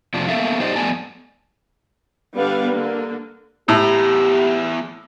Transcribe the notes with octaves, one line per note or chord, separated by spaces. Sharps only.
F2 C3 F3 D4
A#3 B3 A4 A#4 E5 F5
D#4 G4 C5 D5 D#5
F2 A3 B3 D5 G#5 A5
D3 G3 B3 D4 B4 F5
D3 A#3
E2 A2 G4 A#5